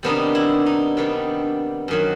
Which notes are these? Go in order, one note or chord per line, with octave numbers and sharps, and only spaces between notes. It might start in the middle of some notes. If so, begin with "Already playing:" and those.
C3 D#3 G3 B3 D4 D#4
E4
D#4
C3 D#3 G3 B3 D4
F#2 D#3 F#3